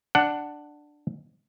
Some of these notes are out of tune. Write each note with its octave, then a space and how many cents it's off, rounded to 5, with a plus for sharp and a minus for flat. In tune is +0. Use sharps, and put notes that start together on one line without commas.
D4 +5 F#5 +10